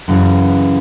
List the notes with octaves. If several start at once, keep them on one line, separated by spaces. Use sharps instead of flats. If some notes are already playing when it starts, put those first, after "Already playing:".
F#2 C#3 E3